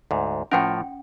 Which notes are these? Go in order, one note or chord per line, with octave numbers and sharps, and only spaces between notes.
D2 G#2
A2 F3 C#4 A#4 F#5 G5